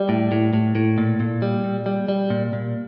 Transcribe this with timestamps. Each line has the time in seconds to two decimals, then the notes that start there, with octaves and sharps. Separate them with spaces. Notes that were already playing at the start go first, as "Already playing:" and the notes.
Already playing: G3 D5
0.09 A2
0.32 A2
0.53 A2
0.75 A2
0.98 A#2
1.20 A#2
1.42 G3
1.64 A#2
1.86 G3
2.09 G3
2.30 A#2
2.53 A#2